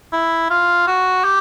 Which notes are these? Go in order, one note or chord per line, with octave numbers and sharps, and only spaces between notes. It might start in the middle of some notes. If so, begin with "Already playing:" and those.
E4
F4
F#4
G4